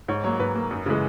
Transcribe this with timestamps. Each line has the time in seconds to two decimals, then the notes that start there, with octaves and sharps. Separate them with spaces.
0.08 G#2 C#5
0.24 F#3 A#3 C#5
0.39 G#2 B4
0.55 F#3 A#3
0.71 F#2
0.86 C#3 E3 G#3